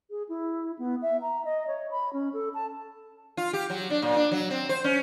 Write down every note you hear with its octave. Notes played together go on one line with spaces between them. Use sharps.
G#4
E4
B3
E5
A#5
D#5
C#5
B5
C#4
A4
A5
F4
G4
F#3
D4
A#2
D4
F#3
C4
C5
C#4